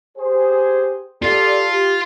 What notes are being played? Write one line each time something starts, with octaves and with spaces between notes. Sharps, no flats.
G4 G#4 C5
F4 G4 A4 D5
G4